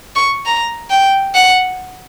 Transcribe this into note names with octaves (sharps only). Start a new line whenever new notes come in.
C#6
A#5
G5
F#5